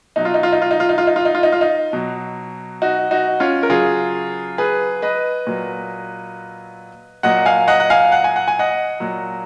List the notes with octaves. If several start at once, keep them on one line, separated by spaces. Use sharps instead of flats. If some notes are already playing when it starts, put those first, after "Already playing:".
B2 F#3 D#4
F4
D#4
F4
D#4
F4
D#4
F4
D#4
F4
D#4
F4
D#4
F4
D#4
F4
D#4
B2 F#3
D#4 F#4
D#4 F#4
C#4 F4
A#4
C#3 F#3 F4 G#4
G#4 B4
B4 D#5
A#2 F#3
A#2 F#3 D#5 F#5
F5 G#5
D#5 F#5
F#5
F5 G#5
F#5
G#5
F#5
G#5
D#5 F#5
A#2 F#3